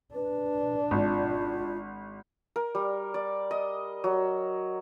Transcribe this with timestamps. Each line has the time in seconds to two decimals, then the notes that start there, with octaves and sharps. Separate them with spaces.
0.15 D4 B4
0.91 G#1 F4
2.56 A#4
2.75 G3
3.14 D5
3.51 D#5
4.04 F#3